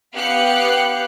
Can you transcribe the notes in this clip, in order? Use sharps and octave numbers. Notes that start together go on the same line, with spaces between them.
B3 G4 F5 F#6 C#7